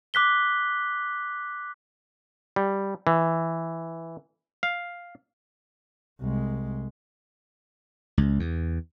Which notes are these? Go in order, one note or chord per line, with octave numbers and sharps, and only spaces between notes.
D6 F#6 B6 G7
G3
E3
F5
C2 G#3
C#2
E2